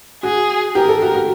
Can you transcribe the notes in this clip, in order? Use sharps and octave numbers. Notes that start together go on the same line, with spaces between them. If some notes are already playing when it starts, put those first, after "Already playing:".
F#4 G#4
G4 A#4
A4
F#4
F#4